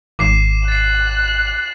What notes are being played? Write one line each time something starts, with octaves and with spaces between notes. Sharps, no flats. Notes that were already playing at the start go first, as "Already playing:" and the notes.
G#1 D6 C7 E7
F#6 A6 C7